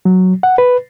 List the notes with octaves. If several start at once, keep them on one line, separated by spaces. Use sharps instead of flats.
F#3
F#5
B4